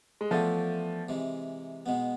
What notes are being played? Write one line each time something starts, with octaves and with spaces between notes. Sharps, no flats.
G#3
E3 F3 A3 B3 D4
C3 E3 G#3
B2 G#3 B3